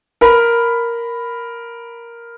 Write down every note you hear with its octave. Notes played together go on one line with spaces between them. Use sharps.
A#4 B5